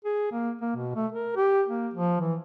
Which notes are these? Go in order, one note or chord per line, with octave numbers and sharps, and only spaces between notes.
G#4
A#3
A#3
B2
A3
A#4
G4
A#3
F3
E3